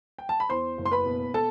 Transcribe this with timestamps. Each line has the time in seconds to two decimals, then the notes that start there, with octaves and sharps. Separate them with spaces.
0.18 G5
0.29 A5
0.40 B5
0.49 E2 C5 C6
0.78 F#1
0.85 C6
0.91 B4 B5
1.06 B2
1.34 A4 A5